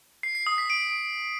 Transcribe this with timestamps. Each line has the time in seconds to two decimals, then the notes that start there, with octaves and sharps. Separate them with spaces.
0.23 C7
0.35 C7
0.47 D#6
0.58 B6
0.70 D7